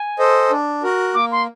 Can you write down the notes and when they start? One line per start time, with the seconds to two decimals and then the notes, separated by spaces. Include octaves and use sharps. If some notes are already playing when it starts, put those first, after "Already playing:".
Already playing: G#5
0.19 A4 C5 D#5
0.51 D4
0.83 F#4 A#4
1.15 A#3 D6
1.32 C6